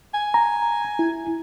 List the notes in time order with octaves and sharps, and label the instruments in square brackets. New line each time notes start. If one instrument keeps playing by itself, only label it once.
[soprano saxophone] G#5
[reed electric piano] A#5
E4